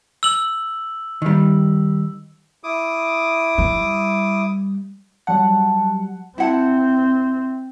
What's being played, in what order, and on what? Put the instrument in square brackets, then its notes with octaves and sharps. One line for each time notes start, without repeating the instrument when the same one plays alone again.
[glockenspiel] E6 F#7
[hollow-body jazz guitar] D#3 G3
[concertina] E4 D6 D#6
[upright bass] G3
[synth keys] F#3 G3 F#5 [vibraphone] A5
[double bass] C4 [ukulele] E4 F#5 A5